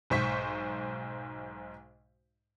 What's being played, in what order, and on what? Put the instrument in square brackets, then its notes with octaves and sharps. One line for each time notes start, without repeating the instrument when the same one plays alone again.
[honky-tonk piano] B1 G#2 C5 C#6 B6